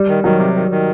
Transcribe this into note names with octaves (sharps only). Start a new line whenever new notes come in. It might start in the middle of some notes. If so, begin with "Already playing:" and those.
Already playing: G3
D#3
D#3 F#3
C3
D#3
D#3